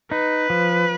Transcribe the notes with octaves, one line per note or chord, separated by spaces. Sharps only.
D#4 B4
F3